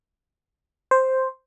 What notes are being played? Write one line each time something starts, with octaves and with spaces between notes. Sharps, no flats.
C5